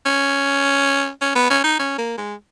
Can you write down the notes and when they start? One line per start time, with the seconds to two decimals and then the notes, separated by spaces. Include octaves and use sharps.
0.05 C#4
1.21 C#4
1.35 B3
1.50 C#4
1.63 D#4
1.79 C#4
1.98 A#3
2.17 G#3